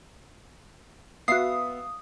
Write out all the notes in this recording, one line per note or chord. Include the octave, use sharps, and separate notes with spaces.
B3 F#4 E5 F5 D#6 C7